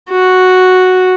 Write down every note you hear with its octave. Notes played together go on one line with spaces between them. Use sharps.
F#4